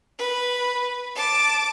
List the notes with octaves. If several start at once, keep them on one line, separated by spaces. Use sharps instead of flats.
B4
A5 D6